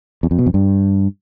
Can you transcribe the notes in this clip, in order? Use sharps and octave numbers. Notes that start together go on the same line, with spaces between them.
E2
F2
B2
F2
G2